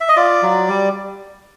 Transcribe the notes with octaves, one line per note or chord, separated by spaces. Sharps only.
E5
D#5
F4 D5
F#3
G3